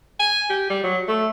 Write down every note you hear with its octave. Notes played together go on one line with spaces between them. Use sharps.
G#5
G4
G3
F#3
A3